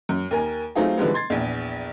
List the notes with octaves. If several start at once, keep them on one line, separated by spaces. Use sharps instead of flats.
F#2
D#2 A#4 G#5
F#3 A3 C4 D#4 F4 G#4
D3 E3 F3 G3 G#3 B3
C6 G#6 A6 C7
A#1 E2